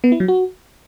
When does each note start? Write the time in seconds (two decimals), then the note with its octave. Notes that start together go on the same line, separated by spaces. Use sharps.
0.04 B3
0.12 E4
0.20 F#3
0.28 F#4